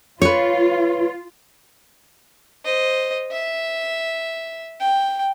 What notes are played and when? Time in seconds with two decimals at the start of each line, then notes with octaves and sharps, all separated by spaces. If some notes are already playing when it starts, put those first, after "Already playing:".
0.22 F4 B4 C#5
2.65 C5 D#5
3.31 E5
4.80 G5